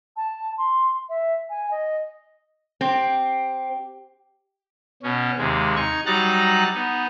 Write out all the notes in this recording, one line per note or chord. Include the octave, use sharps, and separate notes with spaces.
A5
C6
E5
G#5
D#5
C4 G4
B2 C#4
D#2 C3 G#3
D#4 C#6 G#6
F#3 G3 D#4 A#5 F#6 A6
B3 D#4